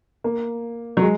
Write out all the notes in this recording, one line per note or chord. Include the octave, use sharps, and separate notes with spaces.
A#3
F#3
G#3